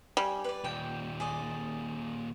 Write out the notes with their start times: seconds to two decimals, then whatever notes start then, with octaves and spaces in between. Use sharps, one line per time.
0.17 G3 G#5
0.44 B4 D5
0.64 D#2 A#2 G5
1.20 G#4 D5 D#5